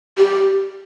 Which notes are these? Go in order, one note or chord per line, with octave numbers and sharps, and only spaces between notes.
G4